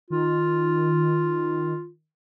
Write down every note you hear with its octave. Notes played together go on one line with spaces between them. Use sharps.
D#3 F4